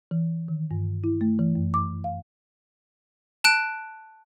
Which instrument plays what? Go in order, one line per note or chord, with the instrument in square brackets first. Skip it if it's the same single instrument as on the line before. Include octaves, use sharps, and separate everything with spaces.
[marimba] E3
D#3
G2
E4
A3
E3
F#2
D6
F5
[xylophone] A5 F#6 D7